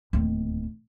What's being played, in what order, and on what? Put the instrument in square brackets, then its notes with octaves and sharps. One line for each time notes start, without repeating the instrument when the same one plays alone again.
[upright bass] D1 D#2